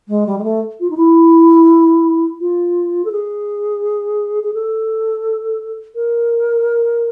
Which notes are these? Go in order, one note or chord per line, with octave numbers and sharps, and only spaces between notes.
G#3
G3
G#3
A3
F4
D#4
E4
F4
A4
G#4
G#4
A4
A#4